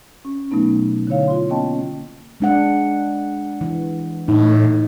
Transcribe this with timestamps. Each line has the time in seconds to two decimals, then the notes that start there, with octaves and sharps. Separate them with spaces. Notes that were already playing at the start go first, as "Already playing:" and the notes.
0.25 C#4
0.51 B2 F#3 A3 B3 D#4
1.07 D3 E4 C#5 F5
1.27 F4 C6
1.49 A#3 B3 C#4 D#5 G5 A5
2.40 G#3 D4 F#5
3.61 E3
4.28 A2 A3 D#4